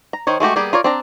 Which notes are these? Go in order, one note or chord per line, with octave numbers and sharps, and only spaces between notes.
A#5
D#3 C5 C#5
G#3 A3 F#4 G4
G3 A#3 B3 G4 G#4
F4 A#4 C#5 D5
C4 D4 A#5